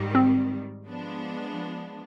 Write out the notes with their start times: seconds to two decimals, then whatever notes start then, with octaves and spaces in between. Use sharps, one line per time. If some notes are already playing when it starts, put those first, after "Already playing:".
Already playing: G#2 D#3 G3
0.15 C4
0.86 F3 G#3 B3 D4